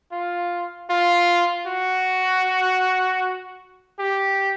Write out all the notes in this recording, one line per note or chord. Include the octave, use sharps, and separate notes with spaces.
F4
F4
F#4
G4